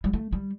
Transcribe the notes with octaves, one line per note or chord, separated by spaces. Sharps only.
G3
A3
G3